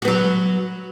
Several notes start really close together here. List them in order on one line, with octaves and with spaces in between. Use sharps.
F#4 B3 F#3